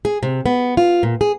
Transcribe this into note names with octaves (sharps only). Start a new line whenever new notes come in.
G#4
C3
B3
F4
A#2
G#4